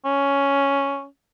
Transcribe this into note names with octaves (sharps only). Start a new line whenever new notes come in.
C#4